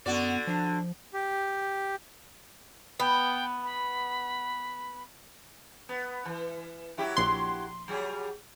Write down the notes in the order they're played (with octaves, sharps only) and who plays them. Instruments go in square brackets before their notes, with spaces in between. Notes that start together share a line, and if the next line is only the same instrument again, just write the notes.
[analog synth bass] F#2 [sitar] D3 F#4 D5 [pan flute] B3
[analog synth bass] F3 [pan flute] D4
[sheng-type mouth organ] G4
[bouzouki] B3 [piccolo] G5
[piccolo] B5
[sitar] B3
E3
F#3 E4 G4
[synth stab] A#1 C6
[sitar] F#3 G3 G#4